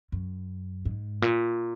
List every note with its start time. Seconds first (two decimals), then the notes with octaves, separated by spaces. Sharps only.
0.12 F#2
0.85 G#2
1.22 A#2